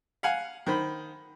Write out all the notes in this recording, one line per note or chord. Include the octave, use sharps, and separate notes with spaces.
F5 F#5 G#5
D#3 C5 B5